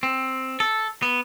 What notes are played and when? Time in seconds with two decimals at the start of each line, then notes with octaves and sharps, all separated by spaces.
0.03 C4
0.60 A4
1.02 B3